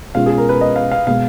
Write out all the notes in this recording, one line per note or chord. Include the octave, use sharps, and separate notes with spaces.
B2 G#3 C#4 F4 F5
G#4
A#4
B4
D#5
F5
F5
B2 G#3 B3 F5